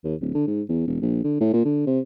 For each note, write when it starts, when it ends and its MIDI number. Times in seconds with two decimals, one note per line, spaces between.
0.04 0.15 39
0.21 0.31 26
0.35 0.47 50
0.47 0.62 44
0.69 0.85 40
0.87 1.01 28
1.01 1.21 34
1.24 1.38 50
1.40 1.52 45
1.53 1.64 46
1.65 1.83 50
1.86 1.99 48